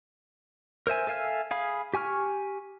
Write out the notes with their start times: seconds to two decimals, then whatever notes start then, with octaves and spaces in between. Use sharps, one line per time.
0.87 A#4 C5 E5 G#5
1.07 A4 E5 F5 G#5 F6
1.51 G#4 F5 B5
1.94 G4 G#5 C#6 F6